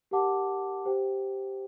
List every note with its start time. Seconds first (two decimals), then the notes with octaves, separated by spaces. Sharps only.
0.11 G4 A#4 F#5 A5 D6
0.85 G4 C5 G5